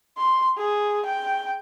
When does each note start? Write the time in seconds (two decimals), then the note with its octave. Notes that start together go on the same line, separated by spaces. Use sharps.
0.17 C6
0.58 G#4
1.06 G5